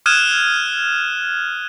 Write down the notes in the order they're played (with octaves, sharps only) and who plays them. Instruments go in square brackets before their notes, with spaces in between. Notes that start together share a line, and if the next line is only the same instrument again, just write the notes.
[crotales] D#6 F6 F#6 G#6 D#7 E7